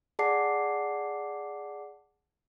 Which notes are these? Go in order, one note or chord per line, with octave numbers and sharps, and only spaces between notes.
G#4 D5 F#5 A5 D6 C7